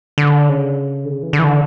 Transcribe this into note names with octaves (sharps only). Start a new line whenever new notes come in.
D3
C#3
D3
C#3
E3
D3
E3
D3